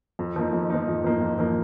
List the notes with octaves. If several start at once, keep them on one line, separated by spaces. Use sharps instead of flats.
F2
F3 A#3 D#4
F2
F3 A#3 D#4
F2
F3 A#3 D#4
F2
F3 A#3 D#4